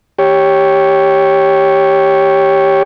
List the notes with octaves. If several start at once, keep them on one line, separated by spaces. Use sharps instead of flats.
G4 C#5